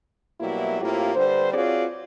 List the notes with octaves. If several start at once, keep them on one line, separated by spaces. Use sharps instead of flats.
B2 F#3 G3 A#3 E4
A2 A#3 C4 E4 F4 G4
D3 G3 B4 C5
C4 F4 F#4 G#4 C#5 D5